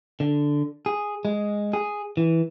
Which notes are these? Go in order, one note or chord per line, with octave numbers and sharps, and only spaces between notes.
D3
G#4
G#3
G#4
E3